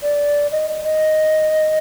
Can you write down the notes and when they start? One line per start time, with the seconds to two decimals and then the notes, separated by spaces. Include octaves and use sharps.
0.03 D5
0.52 D#5
0.84 D#5